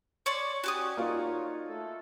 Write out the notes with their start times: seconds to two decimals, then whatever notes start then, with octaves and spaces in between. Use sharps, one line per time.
0.26 C#5 D5 C6
0.64 C#4 F#4 G4 D5 G#5 D#6
0.97 A#3 D#4 F4 C#5
1.66 A3 A4